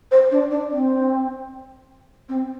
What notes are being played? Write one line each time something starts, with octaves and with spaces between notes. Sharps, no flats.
C5
D4
D4
C4
C4